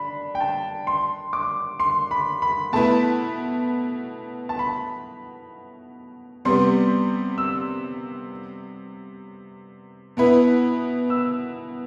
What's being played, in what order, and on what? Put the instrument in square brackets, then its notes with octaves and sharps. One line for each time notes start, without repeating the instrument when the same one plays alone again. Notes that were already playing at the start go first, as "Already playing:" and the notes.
Already playing: [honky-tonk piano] D4 [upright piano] B5
[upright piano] G5
A5
C6
D6
C6
B5
B5
[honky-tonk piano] B2 A3 E4 B4 [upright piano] A5
[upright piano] A5
B5
[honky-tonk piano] C3 G3 B3 [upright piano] C6
[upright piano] E6
[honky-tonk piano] B2 B3 E4 B4
[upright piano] E6